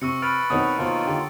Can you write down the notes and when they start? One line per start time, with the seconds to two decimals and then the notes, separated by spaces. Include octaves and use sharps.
0.01 C3 C#6 E6 C#7
0.22 B4 C#6 F6 A6 D7
0.50 B2 D#3 C4 C#5 F#5 D#6
0.78 B2 D#3 A#3 F4 C5
1.05 D3 G4